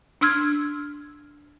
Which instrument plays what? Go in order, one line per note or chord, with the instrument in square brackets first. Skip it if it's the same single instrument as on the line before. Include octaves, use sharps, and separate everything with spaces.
[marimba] D4 C6 E6 F6 G#6